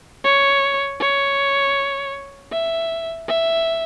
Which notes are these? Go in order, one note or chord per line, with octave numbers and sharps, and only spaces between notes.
C#5
C#5
E5
E5